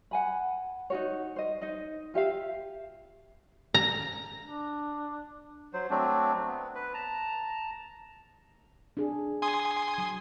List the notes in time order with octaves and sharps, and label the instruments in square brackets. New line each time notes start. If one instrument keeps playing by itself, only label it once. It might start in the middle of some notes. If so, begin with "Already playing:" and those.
[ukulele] F#5 G#5 B5
D#4 F4 F#4 C#5
C5 D#5
D#4 D#5
F4 G4 E5 F5
[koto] A#5
[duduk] D4
[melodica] F#3 C5
F#3 A3 C4 D4
B3
B4
A5 A#5
[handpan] D4 G#4
[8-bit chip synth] G#5 C6 D#6
[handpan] F#3